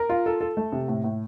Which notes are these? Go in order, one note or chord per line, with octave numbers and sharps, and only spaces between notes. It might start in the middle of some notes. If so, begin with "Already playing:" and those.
Already playing: A#4
F4
A4
A4
A3
C3
A2
A2